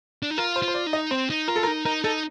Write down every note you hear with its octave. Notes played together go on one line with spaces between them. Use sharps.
D4
D#4
F4 A#4
C5
F4
C5
D5
D#4
D#5
C4 C5
D#4
F4 A#4
A4
A#4
D#4
D#4 A#4
D#4 A4